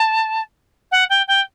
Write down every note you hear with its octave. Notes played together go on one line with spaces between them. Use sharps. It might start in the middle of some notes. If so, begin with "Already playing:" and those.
Already playing: A5
F#5
G5
G5